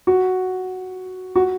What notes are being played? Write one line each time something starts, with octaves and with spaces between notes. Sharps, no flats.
F#4
F#4